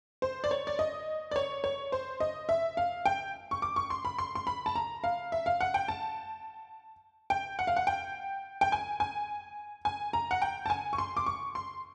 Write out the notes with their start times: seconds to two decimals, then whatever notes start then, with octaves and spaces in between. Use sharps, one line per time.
0.22 C5
0.44 D5
0.51 C#5
0.67 D5
0.79 D#5
1.31 D5
1.36 C#5
1.64 C#5
1.92 C5
2.20 D#5
2.49 E5
2.77 F5
3.05 G5
3.51 C#6
3.62 D6
3.76 C#6
3.90 C6
4.05 B5
4.18 C6
4.35 C6
4.47 B5
4.66 A5
4.75 A#5
5.04 F5
5.32 E5
5.46 F5
5.61 F#5
5.74 G5
5.88 A5
7.30 G5
7.59 F#5
7.67 F5
7.77 F#5
7.87 G5
8.61 G5
8.72 G#5
9.00 G#5
9.85 G#5
10.13 A#5
10.31 F#5
10.42 G5
10.66 A5
10.70 G#5
10.93 C#6
10.98 C6
11.17 D6
11.26 C#6
11.55 C6